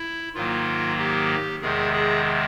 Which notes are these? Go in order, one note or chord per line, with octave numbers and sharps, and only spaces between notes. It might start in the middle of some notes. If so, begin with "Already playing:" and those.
Already playing: E4
G#2 D#3 F#3 A#3 F4
G4
E2 C3 D#3 G#3 G#4
G#4